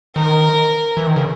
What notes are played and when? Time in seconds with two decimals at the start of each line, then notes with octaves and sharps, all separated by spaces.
0.16 D#3 A#4
0.97 E3
1.07 D#3
1.16 C#3